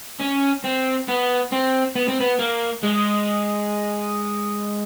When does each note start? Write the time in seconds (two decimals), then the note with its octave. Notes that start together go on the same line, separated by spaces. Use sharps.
0.21 C#4
0.64 C4
1.08 B3
1.52 C4
1.95 B3
2.08 C4
2.20 B3
2.39 A#3
2.83 G#3